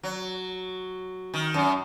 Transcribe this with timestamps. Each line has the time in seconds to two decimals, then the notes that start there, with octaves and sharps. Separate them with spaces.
0.03 F#3
1.34 D#3
1.54 F#2